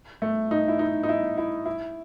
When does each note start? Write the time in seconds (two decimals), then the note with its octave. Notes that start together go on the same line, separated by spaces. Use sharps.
0.22 A3
0.51 D#4
0.68 E4
0.79 D#4
1.03 D#4
1.09 E4
1.38 E4
1.66 E4